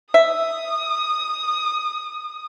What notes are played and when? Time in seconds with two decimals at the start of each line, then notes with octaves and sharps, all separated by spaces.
0.14 E5 D#6